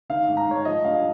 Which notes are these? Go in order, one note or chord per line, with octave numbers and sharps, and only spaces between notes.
D#3 F5
G#2
A#5
G#2 C#5
F3 D#5
G2 F5